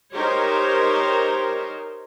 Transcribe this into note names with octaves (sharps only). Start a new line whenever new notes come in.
D#4 G4 A#4 C5 C#5